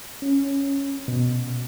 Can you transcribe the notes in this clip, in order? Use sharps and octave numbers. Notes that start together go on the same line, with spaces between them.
C#4
B2